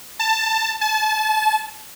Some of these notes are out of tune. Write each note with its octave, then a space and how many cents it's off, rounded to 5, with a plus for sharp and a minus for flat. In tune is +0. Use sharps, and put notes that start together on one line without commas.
A5 +15
A5 -30